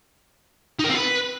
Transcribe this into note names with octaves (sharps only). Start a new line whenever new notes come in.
D#4
A#4
C4
B4